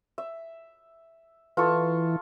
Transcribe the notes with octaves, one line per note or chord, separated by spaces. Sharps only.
E5
E3 F4 A4 C#6